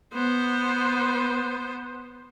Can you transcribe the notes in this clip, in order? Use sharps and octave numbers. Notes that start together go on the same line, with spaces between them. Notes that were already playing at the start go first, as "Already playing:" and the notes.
B3 C5